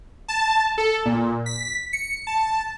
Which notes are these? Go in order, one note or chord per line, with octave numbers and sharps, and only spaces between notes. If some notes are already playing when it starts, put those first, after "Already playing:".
A5
A4
A#2
B6
C#7
A5